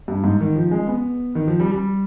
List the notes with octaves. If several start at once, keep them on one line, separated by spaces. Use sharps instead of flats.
G2
G#2
D#3
F3
G#3
B3
D#3
F3
G3
G3